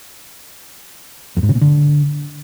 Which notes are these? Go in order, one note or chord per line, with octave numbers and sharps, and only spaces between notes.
F2
G#2
C#3
A#2
D3